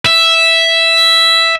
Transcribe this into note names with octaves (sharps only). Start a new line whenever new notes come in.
E5